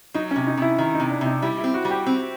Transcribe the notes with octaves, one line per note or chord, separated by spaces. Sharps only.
F#3 D#4
C#4
C3
D#4
C3 E4
D#3 D#4
D#4
C3
D4
C3 D#4
G3 E4
E4
C4
F#4
G3
G4
C4